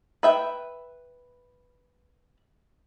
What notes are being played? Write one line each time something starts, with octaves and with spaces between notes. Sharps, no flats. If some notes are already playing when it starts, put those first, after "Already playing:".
B4 E5 G5